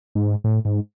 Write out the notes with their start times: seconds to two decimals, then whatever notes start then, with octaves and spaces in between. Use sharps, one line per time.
0.15 G#2
0.44 A2
0.65 G#2